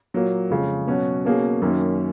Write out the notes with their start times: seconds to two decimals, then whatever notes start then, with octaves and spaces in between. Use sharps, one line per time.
0.14 A#2 F#3 A#3
0.50 F2 C#3 G#3
0.87 B2 F#3 C#4 F#4
1.25 B2 A#3 C#4 G#4
1.62 F#2 D#3 A#3 C#4